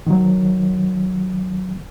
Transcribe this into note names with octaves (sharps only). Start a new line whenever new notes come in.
D#3 F#3